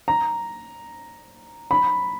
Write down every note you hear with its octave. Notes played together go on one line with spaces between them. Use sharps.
A#5
B5